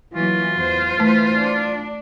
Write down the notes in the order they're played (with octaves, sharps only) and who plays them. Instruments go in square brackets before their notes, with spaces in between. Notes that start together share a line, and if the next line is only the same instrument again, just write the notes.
[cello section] E3 F#3 A#3 [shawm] F4
[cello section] E2 C5
[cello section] E3 B4 C5 [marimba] A3
[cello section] D4